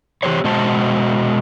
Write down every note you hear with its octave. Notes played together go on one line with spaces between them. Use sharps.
E3 G4 G#4 C5 C#5
B2 G#3 F#4 C5 A5